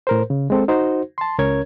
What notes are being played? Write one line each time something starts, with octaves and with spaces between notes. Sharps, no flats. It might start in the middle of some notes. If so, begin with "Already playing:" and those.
A2 A#4 C5
C#3
G#3 C4 A4
D#4 F#4 C5
A5 C6
C#2 C#4 A#4 C#5 G#6